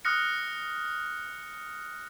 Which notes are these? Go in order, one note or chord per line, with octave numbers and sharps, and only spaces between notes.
D#6 F6 F#6 A#6 C#7